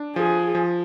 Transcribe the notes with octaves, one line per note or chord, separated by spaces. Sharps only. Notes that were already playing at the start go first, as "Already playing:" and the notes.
Already playing: D4
F3 G#4
F3